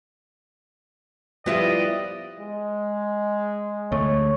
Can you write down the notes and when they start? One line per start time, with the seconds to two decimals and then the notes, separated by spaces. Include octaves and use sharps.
1.46 F3 G3 B3 E4 F4 G4 D5 D#5
2.39 G#3
3.92 D2 A3 C#5